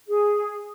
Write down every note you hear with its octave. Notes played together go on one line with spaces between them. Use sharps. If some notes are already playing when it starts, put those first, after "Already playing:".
G#4